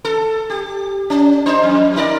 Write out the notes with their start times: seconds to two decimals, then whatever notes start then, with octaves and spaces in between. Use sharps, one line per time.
0.05 A4
0.50 G4
1.10 C#4
1.46 D4 C5
1.63 F2
1.96 D#4 A#4 D5